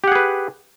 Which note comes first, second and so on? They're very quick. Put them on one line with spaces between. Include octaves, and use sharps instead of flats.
G4 F#5 G#4 B4